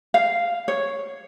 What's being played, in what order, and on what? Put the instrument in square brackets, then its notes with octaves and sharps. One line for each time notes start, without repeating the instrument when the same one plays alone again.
[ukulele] F5
C#5